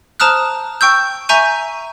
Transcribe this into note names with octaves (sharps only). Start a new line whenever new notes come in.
C5 A5 A#5 D#6 F6 F#6
G5 C#6 E6 G6
E5 G#5 A#5 C#6 G6 D#7